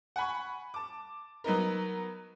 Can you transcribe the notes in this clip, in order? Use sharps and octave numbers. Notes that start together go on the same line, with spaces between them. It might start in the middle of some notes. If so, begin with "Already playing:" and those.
F#5 G#5 B5 C#6
A5 D6
F#3 B3 D#4 A#4